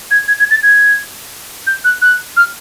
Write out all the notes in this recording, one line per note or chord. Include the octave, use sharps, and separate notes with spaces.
G#6
G#6
G#6
A6
G#6
G6
F#6
F#6
F6